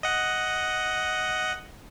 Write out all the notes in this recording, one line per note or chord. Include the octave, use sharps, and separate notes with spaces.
D#5 F#5